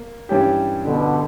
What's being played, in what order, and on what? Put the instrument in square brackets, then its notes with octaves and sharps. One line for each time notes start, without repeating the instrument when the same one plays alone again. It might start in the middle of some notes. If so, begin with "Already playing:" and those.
Already playing: [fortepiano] A#3
G2 E3 G3 C#4 G4
[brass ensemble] B2 D3